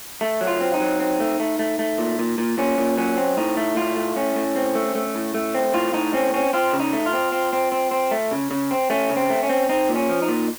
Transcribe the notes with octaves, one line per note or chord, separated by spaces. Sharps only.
A3
F#3
F4
C4
D#4
F#3
C4
A3
A3
A3
A3
A#2
A#2
A#2
A#2 C#4
A#2
F#3 C#4
C4
A2 D#4
A3
A2 F4
A3
A2 C#4
A2
C4
A3
A3
A2
A3
C4
A2 F4
A2 D#4
C4 C#4
C4 C#4
C4 F4
C#3
D#4
A3
F4
C4
C4
C4
C4
C4
A3
C#3
C#3
C4
A3 C#4
C#3
C4
A3
C#4
C4
C4 D#4
A#2
C#4
F3
D#4
A#2